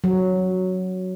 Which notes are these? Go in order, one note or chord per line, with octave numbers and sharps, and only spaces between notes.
F#3